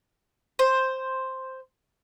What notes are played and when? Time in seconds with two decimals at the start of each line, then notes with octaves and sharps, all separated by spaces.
0.59 C5